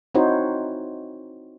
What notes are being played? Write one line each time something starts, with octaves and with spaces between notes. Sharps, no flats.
C4 D#4 E4 F#4 C5 C#5